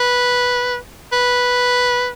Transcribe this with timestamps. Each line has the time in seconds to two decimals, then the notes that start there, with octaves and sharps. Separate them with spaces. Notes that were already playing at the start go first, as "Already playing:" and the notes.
Already playing: B4
1.12 B4